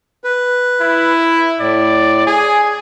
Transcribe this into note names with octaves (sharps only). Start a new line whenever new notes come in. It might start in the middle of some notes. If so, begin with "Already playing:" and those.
B4
E4
A2 D5
G#4 G#5